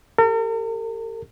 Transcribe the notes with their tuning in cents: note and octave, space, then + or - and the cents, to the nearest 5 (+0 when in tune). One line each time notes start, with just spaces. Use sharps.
G4 +30 A#4 -45